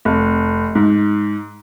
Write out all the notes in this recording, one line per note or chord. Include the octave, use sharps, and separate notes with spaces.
F1
G#2